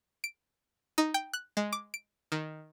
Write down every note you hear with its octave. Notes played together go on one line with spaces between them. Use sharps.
D7
D#4
G5
F#6
G#3
D6
D7
D#3